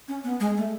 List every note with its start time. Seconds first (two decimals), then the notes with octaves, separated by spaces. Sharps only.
0.08 C#4
0.24 B3
0.40 G#3
0.57 A3